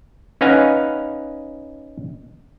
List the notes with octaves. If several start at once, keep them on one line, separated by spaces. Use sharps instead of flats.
C#4 D#4 B4 F5 F#5 G#5